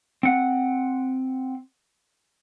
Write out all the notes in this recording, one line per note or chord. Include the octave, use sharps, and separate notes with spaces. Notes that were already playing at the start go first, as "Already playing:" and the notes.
C4 F#5